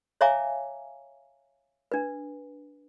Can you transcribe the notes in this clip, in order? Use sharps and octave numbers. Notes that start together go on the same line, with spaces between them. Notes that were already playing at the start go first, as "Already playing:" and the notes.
C#5 E5 F5 G#5 A#5 D6
D4 B4